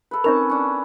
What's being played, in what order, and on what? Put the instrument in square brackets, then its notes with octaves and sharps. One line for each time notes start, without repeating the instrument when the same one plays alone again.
[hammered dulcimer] A4 B4
[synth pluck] C4 D#4 A#4 [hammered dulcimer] C#4 A5
[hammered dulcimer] C#4 D4